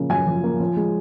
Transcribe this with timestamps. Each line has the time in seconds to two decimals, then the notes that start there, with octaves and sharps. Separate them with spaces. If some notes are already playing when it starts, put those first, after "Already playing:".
Already playing: C#3 F3 A#3
0.10 F#2 G#5
0.26 F3
0.44 A#3
0.60 F3
0.77 G#3